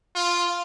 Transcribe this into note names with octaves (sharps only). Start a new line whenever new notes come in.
F4